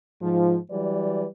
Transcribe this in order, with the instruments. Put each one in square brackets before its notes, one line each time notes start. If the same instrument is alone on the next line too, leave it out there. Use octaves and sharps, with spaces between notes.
[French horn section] G#2 F3
E3 F#3 G3 B4 D5